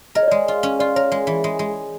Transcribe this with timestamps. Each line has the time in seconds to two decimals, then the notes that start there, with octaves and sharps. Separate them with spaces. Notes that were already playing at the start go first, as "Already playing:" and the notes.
0.15 A#4 D#5
0.23 C#5
0.28 G#3 D5
0.48 F4
0.63 C#4
0.80 F4 D5
0.96 A#4 C#5
1.12 G#3
1.27 E3
1.44 G#3
1.59 G#3